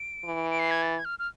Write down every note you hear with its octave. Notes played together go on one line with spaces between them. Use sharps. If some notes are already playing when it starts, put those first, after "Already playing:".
Already playing: D7
E3
D7
C7
G#6
A6
G#6
F6
F6